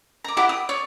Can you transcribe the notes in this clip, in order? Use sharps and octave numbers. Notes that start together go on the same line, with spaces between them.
A#5 D6
E4 G4 F#5 D6
D#6
C#5 D5